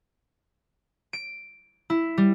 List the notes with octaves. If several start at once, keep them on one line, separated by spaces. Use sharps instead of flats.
D7
E4
G3